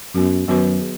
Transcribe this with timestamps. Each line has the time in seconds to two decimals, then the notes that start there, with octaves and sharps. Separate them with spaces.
0.14 F#2 F#3 B3 F#4
0.47 F#2 D#3 F#3 B3 F#4 B4
0.81 G#4